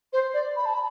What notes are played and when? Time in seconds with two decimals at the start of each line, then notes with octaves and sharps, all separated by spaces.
0.12 C5
0.34 D5
0.56 B5
0.65 A5
0.74 B5